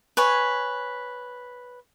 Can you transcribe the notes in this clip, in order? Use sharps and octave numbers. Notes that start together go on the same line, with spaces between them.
B4 C#5 G#5